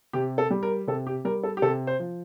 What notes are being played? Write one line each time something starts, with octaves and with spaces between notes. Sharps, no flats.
C3 G4
A4
G3
A#4
C3 A4
G4
G3 A#4
A4
G4
C3 A4
C5
F3